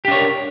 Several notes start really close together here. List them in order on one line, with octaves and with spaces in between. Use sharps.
G4 D4 C#5 A#4